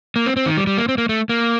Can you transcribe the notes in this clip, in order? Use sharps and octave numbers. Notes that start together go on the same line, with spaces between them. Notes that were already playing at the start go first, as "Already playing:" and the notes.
A#3
C4
C4
D#3
G3
G3
A#3
C4
A#3
A3
A#3